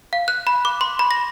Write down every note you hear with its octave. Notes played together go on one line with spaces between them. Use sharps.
F5
F#6
B5
D6
C6
B5
A#6